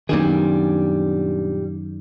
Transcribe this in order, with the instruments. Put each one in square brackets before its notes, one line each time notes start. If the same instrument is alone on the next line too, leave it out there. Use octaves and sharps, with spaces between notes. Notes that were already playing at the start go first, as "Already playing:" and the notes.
[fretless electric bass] F#2 D#3 [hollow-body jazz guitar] A#2 G3 G#4 [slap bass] B3 D4